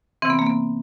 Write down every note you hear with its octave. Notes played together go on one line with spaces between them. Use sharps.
C3 E3 C4
B3
A#3
B3